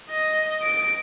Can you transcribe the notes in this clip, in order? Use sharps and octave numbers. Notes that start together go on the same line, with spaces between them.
D#5
D7